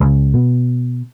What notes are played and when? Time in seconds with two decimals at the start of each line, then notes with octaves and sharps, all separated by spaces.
0.01 C#2
0.34 B2